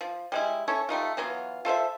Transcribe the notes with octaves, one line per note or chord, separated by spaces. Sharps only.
F3
G3 G#3 E4
C#4 E4 A4 C#5
G3 A3 D#4 F4
E3 F#3 B3 F4
F4 A4 C5 E5